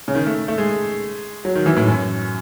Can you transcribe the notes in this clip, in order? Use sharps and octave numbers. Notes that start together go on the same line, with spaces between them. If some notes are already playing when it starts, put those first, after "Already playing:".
C#3
D#3
A3
A3
G#3
F#3
D#3
E3
A2
F#2